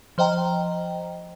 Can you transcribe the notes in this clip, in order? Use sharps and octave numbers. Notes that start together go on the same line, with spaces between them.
F3 C5 D#5 G5 A#5